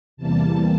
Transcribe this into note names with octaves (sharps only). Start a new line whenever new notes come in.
E2 C3 E3 G3 A#3 A5